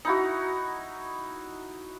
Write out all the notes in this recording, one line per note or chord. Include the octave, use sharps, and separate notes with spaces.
D#4 E4 F#4